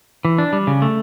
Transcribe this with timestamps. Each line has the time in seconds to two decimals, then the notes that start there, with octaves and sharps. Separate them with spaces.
0.25 E3
0.38 D4
0.53 G3
0.67 C#3
0.82 A3